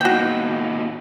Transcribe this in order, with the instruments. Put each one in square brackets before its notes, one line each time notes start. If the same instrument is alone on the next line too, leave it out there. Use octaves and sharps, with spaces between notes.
[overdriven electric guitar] D#2 B2 [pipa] F#4 G5